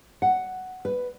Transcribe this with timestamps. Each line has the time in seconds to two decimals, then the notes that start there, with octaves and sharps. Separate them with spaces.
0.22 F#5
0.85 B4